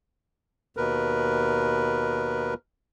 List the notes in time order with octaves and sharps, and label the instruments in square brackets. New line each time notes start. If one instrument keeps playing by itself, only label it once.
[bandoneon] D#2 B2 A#4 B4